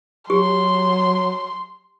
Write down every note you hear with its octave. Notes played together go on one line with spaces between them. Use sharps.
F#3 G4 C6